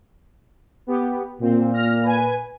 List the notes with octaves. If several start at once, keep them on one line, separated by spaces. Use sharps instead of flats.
B3 G4
A#2 C4
F6 A#6
B4 G#5